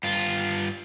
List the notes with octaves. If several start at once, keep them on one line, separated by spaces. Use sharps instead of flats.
G2 F4